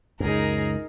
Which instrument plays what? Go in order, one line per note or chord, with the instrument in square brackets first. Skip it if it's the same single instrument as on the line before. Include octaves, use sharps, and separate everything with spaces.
[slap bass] C#2 F#2 [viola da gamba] D#4 G#4 A#4